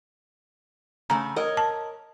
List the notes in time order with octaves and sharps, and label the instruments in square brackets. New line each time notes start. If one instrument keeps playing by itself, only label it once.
[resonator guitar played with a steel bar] C#3 A3 [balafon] A#5
[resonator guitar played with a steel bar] A#4 C#5 D#5
[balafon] A5